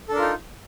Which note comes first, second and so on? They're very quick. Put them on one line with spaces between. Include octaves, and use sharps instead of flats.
A4 D4 A#4 F4 D#4